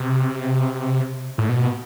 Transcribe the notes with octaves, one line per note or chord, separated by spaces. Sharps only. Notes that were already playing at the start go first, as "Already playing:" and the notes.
Already playing: C3
A2
B2